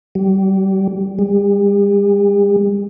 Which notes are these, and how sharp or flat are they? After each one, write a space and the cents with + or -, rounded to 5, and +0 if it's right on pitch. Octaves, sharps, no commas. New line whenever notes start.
G3 -30
G3 +45